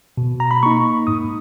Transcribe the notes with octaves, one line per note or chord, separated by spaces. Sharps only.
B2
A#5
B5
A#3 D#4 C#6
G#2 D#6